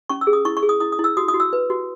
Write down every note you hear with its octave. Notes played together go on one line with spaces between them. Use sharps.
C#4 C#6
E6
G#4
D#6
E4 C#6
C#6
G#4
D#6
E4 D#6
D#6
E4
E6
F#4 D#6
D#6
F#4
E6
B4
F#4